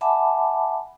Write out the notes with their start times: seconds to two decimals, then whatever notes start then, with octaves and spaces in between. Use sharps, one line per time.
0.01 E5 F#5 G#5 A5 B5 D6